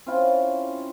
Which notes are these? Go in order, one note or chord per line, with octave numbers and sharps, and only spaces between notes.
C4 C#4 E4 F4